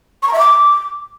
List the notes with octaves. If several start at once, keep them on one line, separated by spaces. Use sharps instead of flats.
C#6
A#5
E5
D6